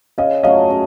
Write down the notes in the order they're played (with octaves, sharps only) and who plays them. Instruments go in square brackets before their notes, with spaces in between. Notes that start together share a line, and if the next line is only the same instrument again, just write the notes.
[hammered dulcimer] C#3 [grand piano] D#5 F5
[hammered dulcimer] F#3 A3 C#4 [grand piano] D#5 F5
[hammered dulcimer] C#3